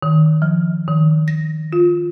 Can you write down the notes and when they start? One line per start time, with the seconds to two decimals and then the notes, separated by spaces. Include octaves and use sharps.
0.03 D#3
0.42 F3
0.88 D#3
1.28 A#6
1.73 F4